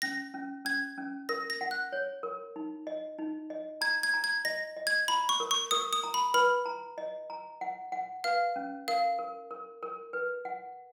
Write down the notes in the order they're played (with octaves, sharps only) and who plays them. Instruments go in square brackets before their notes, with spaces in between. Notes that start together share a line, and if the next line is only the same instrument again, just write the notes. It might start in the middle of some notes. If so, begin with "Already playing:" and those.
[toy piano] C#4 [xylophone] A#6
[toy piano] C#4
[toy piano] C#4 [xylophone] G#6
[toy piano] C#4
[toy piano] A#4 [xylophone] A#6
[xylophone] A#6
[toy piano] F#5
[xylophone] F#6
[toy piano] C#5
A#4
D#4
D#5
D#4
D#5
[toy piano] A#5 [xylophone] G#6
[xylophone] G#6
[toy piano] A#5
[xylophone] G#6
[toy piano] D#5 [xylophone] A#6
[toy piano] D#5
[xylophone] G#6
[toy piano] A#5 [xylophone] B5
[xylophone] C#6
[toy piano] A#4
[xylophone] C#6
[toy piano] A#4 [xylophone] D#6
[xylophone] D#6
[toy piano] A#5
[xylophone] B5
[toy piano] B4 [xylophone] B5
[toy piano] A#5
D#5
A#5
F#5
F#5
[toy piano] B4 [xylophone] F5
[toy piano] C#4
[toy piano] A#4 [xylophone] F5
[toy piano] A#4
A#4
A#4
B4
F#5